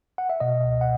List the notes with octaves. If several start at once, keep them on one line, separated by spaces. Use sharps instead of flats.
F#5
E5
B2 D#5
C#2
F#5